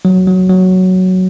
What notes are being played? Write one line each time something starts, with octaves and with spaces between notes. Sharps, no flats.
F#3
F#3
F#3